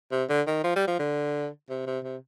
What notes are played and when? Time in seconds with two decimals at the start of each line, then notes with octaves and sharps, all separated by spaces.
0.12 C3
0.29 D3
0.47 D#3
0.64 F3
0.76 G3
0.87 F3
0.99 D3
1.69 C3
1.87 C3
2.04 C3